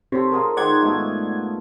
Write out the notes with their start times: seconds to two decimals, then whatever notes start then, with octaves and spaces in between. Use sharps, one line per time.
0.12 C3 A4 C5 C#5
0.31 F4 G#4 A#4
0.57 D#3 G#4 C5 D5 F#5 G#6
0.82 G#2 B2 A3